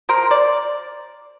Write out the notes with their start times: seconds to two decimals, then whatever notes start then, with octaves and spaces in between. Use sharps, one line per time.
0.09 A#4 C5
0.31 C5 D5